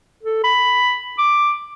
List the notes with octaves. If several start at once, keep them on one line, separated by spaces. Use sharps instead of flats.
A4
B5
D6